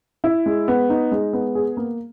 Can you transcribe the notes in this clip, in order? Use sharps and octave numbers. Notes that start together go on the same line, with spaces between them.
E4
G#3
B3
D#4
G#3
B3
G#4
A#3